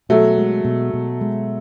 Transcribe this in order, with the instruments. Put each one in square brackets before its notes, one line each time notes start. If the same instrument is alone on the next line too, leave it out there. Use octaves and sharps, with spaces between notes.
[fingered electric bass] B2 [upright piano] F#3 A3
[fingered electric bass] G#3
B2
B2
G#3